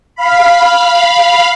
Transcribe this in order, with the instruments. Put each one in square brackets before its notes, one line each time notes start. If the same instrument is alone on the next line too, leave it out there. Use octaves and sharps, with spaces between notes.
[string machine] F5 B5